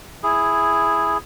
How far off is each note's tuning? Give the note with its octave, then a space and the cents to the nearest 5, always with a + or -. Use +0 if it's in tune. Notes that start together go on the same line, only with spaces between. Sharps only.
E4 +0 G#4 +0